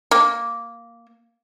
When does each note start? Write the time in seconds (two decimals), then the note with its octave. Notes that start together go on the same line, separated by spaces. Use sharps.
0.11 A#3